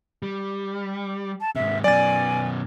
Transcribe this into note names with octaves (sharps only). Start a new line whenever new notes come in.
G3
A5
G#2 C3 E5
F#2 B2 D5 G#5 A6